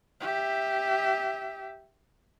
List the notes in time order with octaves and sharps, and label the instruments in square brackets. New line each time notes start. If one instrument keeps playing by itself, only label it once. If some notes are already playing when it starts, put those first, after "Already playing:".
[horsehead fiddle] G4 E5